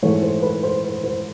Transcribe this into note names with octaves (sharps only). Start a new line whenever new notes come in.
G#2 E3 A3 C#5
C5
B4
C5
C5
C5